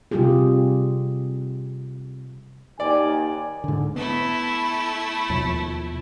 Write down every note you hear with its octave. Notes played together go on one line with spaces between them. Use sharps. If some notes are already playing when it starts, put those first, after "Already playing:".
C3 G3 F4 G4 G#4
D#2 D5 G#5
G#2 D3
A3 B3 E4
D#2 B2 F3